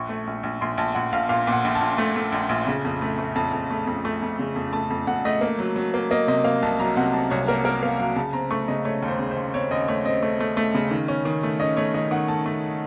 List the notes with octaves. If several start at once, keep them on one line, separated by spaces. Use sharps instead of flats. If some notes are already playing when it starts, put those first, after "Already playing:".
Already playing: A#1 C#6
A3
A#1
A#1
A#1 C6
A#1 A5
A#1 F#5
A#1 F5
A#2 F5
A#2
F#5
A#1
A5
A#1
A3
A3
A#1
A#1
C#3
F2
A3
A3
F2 A5
F2
A3
F2
A3
F2
C#3
F2
A3 A5
F2
F2 F#5
A3 D#5
A#3
F#3
F#3
A#3
A#3 D#5
C3 D#5
A#3 F5
C2 A5
F#3 A#5
C3 F#5
C3 A5
C2 C#5
A#3 A#4
A#3 A#4
A#3 F5
F#3 F5
C#3 A5
C4 A#5
A3 C#6
C#3 D#5
A3 C#5
D#2
C5
C#3
C5
D#2
C4 C#5
D#2 D#5
A3 C#5
C4 D#5
A3
A3
A3
C#3
D#3
C#4
D#3
A3
C#4 D#5
A3 C#5
D#3 D#5
D#3 F#5
A3 A5
A3